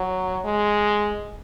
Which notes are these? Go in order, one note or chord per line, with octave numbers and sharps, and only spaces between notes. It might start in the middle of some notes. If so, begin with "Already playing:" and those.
Already playing: F#3
G#3